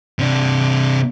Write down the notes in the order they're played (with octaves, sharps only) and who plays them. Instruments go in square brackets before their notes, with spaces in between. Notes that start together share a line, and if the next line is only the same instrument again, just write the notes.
[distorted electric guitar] C3 D4